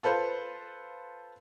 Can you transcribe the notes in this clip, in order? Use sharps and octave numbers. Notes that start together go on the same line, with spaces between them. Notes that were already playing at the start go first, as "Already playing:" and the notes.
F4 A4 B4 C5 F5